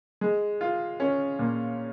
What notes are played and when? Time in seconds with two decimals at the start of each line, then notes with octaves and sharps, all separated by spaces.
0.21 G#3
0.61 F4
1.00 C#4
1.39 A#2